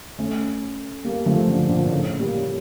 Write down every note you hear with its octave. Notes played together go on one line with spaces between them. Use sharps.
A3 C#4
G3 A#3
F3 A3
D3 F3
A#2 D3
A2 C#3
G3 A#3